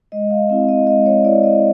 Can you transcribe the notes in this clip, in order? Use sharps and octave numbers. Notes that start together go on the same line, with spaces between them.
G#3 D#5
F5
C4 E4 F5
D#5
G#3 D#5
C#5
C4 E4 D5
D#5